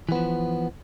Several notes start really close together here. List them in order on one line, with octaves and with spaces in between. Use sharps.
E3 B3 F3